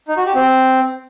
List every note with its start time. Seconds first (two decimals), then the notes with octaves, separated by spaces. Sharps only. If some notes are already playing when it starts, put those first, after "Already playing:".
0.08 D#4
0.17 F#4
0.26 G4
0.35 C4